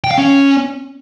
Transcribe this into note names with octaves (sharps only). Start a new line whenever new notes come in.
G5
F5
C#4